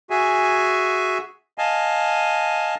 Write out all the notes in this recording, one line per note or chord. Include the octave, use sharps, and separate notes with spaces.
F#4 G#4 E5 G#5
D#5 F5 G#5 A5